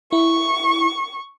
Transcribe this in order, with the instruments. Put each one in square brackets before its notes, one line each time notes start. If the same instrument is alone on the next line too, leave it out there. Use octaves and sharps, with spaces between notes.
[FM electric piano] E4 [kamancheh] C#6